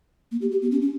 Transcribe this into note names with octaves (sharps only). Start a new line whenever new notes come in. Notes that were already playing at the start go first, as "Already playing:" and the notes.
A#3
G4
G4
B3
C#4
C#4